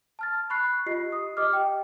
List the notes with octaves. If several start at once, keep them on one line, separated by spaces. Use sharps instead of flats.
A5 F6 A6
B5 C#6 F#6 C7
F4 G4 D#5 C7
D#6
G4 D#5 D6 F6
G5